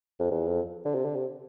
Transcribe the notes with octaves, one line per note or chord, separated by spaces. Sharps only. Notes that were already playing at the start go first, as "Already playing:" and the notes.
F2
E2
F2
D3
C3
D3
C3